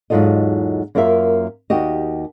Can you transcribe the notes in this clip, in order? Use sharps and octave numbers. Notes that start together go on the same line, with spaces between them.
E2 G#2 F#3 F4 A4 D#5
F#2 A#3 F4 A#4 E5
D#2 F#4 G4 D#5